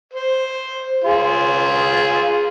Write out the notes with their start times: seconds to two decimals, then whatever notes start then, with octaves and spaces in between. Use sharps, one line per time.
0.13 C5
1.04 F4 G#4